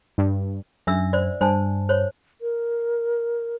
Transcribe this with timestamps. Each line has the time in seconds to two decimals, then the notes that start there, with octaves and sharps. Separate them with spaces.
0.18 G2
0.87 F#2 D4 E5 E6
1.13 C5 D5
1.41 G2 C5 G#5 A5
1.89 C5 C#5
2.41 A#4